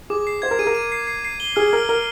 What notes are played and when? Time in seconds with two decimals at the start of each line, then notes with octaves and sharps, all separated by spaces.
0.10 G#4 D6
0.27 C7
0.42 C5 G#6
0.51 A#4
0.59 G#4 D#7
0.67 A#4
0.75 D#7
0.92 C7
1.07 C7
1.25 C7
1.40 G7
1.56 G#4 F6
1.73 A#4 F6
1.89 A#4 F6